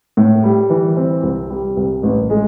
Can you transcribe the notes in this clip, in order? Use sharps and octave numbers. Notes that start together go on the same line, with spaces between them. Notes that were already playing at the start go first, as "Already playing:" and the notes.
A2
G3
E3
C4
C2
G3
C2
A1
G#3